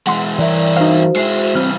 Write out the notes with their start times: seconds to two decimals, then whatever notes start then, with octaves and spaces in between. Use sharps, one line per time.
0.07 E3 G#3 F#5 C6
0.39 G2 E3 E4 A#4 D5 E5
0.77 D#4 F#4 C5 F5
1.16 G#3 E4 C7
1.55 E3 G3 C4 F6